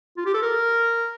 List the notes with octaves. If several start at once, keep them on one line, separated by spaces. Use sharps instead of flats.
F4
G4
A4
A#4